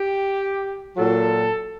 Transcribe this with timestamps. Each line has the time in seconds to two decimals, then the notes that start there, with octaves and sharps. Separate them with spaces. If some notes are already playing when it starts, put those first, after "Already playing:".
Already playing: G4
0.96 A#2 F#3 A4